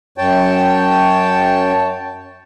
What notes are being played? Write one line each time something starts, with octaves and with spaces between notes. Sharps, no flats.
F#2 C#5 G5 A5